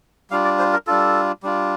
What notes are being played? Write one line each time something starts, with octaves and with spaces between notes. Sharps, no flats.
G3 D4 F4 F5
D5
C5
A#4
G3 D4 F4 A4
G3 D4 F4